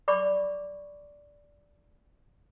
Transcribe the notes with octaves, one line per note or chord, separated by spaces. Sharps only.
D5 B5 C#6 D6